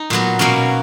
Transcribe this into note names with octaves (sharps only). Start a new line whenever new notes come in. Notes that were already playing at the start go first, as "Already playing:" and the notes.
Already playing: D#4
A#2 F#3 B3
B2 F#3 A#3 C#4